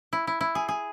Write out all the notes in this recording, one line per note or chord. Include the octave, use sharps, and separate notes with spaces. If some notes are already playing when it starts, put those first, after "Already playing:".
E4
E4
E4
G#4
G#4